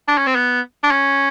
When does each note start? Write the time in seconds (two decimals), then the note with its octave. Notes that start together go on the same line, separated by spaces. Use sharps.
0.08 D4
0.18 C#4
0.27 C4
0.36 B3
0.83 D4
0.91 C#4